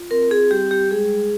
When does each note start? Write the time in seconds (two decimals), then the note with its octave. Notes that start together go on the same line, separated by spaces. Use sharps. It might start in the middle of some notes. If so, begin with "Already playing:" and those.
Already playing: F4
0.11 C4 A#4
0.31 G#4
0.51 G3 G4
0.71 G4
0.91 G#3 G#4